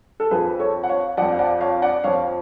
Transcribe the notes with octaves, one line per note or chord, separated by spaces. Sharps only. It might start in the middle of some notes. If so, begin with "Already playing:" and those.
A4
F2 F3 G#4 B4
A4 C#5
F#5
C#5 F5
F2 F3 D5 F#5
F5
D5 F#5
C#5 F5
D5 F#5
F2 F3 C#5 F5